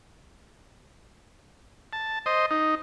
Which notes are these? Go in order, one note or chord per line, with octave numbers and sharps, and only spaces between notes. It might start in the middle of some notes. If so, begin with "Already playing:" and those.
A5
C5 D#5
D#4